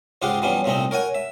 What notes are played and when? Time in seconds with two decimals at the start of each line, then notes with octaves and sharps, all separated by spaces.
0.22 C#2 G#2 G#3 F4 G4 F#5
0.42 E3 F3 G3 B3 C#4
0.64 C2 A#2 A3 C4 D#4
0.91 A#4 C#5 F#5 G#5
1.15 E5